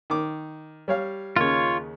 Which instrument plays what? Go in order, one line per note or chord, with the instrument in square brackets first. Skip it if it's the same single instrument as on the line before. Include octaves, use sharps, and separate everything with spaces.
[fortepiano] D#3 D6
G3 C#5 F5
[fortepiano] D#2 C#3 [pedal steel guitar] F4 C#5